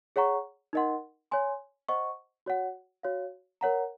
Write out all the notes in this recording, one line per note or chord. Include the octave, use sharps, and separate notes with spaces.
G#4 C#5 F#5 A#5 C#6
D#4 A#4 D#5 F#5 C6
C#5 G#5 C6
C5 D#5 F#5 C#6
F#4 C#5 F#5
F#4 C#5 F5
A#4 C#5 F#5 A#5